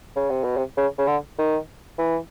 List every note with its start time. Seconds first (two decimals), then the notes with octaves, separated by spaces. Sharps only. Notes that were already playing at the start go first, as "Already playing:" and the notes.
0.16 C#3
0.30 C3
0.44 B2
0.57 C3
0.77 C#3
0.98 C#3
1.07 D3
1.38 D#3
1.98 E3